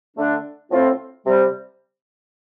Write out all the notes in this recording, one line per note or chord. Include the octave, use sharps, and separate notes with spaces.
D3 A3 D4
A2 F3 C4 F4
C3 G3